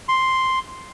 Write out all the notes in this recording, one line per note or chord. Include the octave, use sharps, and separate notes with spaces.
C6